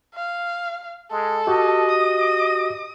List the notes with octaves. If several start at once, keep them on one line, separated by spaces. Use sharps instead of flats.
F5
G#3 A4
F#4 G4 D#5
D#6